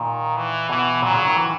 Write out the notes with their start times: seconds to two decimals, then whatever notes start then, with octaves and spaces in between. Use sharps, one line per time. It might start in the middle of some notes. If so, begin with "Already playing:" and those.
Already playing: A#2 D#3
0.37 E3
0.69 B2 E3
1.02 A#2 F#3
1.13 C#3
1.25 D#3
1.36 E3